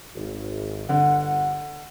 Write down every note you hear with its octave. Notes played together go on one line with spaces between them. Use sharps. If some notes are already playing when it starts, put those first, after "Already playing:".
G#1
G1 D3 F#5